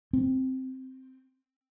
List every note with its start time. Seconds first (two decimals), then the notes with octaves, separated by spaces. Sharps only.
0.13 C4